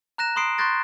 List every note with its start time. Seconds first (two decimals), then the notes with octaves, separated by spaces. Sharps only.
0.18 A#5 F#6 A#6 E7
0.36 B5 C6 D#6 C7 D7
0.58 C6 C#6 F#6 G6 A6 A#6